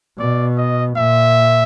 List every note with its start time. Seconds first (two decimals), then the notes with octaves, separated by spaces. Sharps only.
0.18 B2 D5
0.57 D#5
0.96 A#2 E5